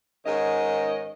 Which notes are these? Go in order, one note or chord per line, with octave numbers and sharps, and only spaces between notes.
G#2 D#3 C#4 D#5